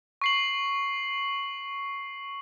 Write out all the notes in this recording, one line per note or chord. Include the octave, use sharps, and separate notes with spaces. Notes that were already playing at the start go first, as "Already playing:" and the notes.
C#6 C7 F#7